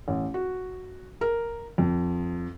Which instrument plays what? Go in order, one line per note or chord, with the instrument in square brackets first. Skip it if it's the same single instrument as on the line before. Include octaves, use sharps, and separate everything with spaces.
[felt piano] A1
F#4
A#4
F2